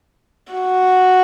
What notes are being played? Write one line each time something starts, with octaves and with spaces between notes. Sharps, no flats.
F#4